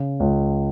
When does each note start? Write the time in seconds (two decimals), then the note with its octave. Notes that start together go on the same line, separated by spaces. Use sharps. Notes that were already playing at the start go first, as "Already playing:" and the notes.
Already playing: C#3
0.20 C#2